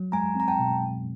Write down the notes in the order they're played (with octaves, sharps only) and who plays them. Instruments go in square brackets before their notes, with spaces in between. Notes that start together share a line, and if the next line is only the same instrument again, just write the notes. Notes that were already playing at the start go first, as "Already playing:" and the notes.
Already playing: [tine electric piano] F#3
[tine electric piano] G#3 [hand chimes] G#5 A#5
[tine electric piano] C4 [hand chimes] A#5
[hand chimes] G5 A5
[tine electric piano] B2